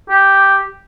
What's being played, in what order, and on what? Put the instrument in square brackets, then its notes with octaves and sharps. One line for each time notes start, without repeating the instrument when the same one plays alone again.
[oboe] G4